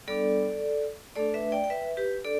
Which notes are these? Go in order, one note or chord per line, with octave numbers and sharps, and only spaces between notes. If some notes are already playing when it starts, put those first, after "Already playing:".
G3 B3 D4 A4 D5
A3 D4 A4 D5
B4 E5
D5 G5
G5
B4 E5
G4 B4
D4 A4 D5